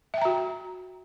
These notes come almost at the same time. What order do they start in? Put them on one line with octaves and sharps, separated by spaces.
E5 G5 A#5 F#4